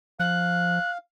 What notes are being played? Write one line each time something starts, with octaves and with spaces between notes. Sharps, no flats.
F3 F5 F#6